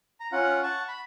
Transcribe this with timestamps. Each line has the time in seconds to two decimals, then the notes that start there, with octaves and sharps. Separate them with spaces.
0.20 A#5
0.32 C#4 F4 F#5
0.63 F#5 A5 C#6
0.88 B5